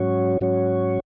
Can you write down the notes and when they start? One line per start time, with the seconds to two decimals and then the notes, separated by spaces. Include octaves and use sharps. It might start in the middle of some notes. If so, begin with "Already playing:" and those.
Already playing: G#2 F#3 C#4 F#4 C#5
0.41 G#2 F#3 C#4 F#4 C#5